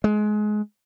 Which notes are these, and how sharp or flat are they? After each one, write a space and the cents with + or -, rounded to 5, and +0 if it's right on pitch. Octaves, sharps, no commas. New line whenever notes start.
G#3 +25